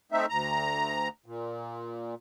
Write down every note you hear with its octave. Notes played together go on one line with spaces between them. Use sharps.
A3 C4 D#4 E5
D2 A#5
A#2